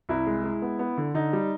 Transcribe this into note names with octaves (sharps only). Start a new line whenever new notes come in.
C2 E4
G#3
G#3
B3
B3
D3
D3 D#4
G3